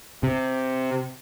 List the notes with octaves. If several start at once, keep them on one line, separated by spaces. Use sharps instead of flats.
C3